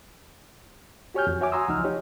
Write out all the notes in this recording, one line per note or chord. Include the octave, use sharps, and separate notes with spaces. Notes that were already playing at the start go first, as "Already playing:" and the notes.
F#4 G4 C#5 G#5 F6 G6
F2
F#4 C#5 E5 G#5 D6
F#5 G#5 A#5 C6 D#6 E6
C#2 F3 D#4 F6
D#4 G4 C#5